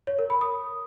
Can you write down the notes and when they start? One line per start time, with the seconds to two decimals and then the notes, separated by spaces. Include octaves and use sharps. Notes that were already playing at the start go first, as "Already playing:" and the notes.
0.07 C#5
0.19 A#4
0.30 B5
0.41 D#6